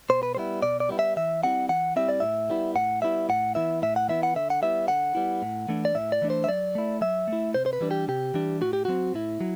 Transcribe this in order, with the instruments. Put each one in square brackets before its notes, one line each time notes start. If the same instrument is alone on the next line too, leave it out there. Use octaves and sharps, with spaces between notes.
[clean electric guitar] B2 C5
B4
G3 B3 E4 C5
B2 D5
D5
G3 B3 E4
E5
E3 E5
G3 C4 E4 F#5
E3 F#5
G3 C4 E4 E5
D5
A2 E5
G3 B3 E4
A2 F#5
G3 B3 E4 E5
A2 F#5
E3 B3 E4 E5
A2 E5
F#5
E3 B3 E4 E5
F#5
D3 E5
F#5
G3 B3 E4 E5
D3 F#5
G3 B3 E4
A2
E3 A3 D4
D5
A2 E5
D5
E3 A3 D4
C5
E5
F#3 D5
A3 E4
F#3 E5
A3 E4
C3 C5
C5
B4
E3 G3 D4
G4
C3 G4
E3 G3 D4
A2 F#4
G4
F#3 C4 F#4
A2 E4
F#3